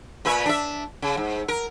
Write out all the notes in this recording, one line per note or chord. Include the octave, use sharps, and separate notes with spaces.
A#2 B4 E5
D4 E5
C#3
G#2
A#4